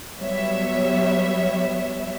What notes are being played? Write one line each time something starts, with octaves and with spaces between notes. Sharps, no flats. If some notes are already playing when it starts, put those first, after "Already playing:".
F#3 G3 B3 C#5 E5